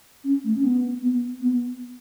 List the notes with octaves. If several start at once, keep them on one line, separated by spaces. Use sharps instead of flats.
C#4
A3
C#4
B3
B3
B3